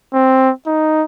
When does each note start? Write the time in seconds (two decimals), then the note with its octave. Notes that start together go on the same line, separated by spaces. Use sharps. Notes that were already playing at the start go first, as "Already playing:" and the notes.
0.14 C4
0.67 D#4